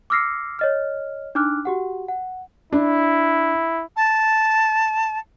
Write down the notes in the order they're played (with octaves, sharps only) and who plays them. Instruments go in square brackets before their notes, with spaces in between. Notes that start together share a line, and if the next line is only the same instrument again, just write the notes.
[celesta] D6 E6 F6 A#6 C7 C#7
C#5 D#5 F6
D4 D#4 D6 F6 F#6
F#4 G4 F#5
F#5
[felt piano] D4 [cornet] E4
[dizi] A5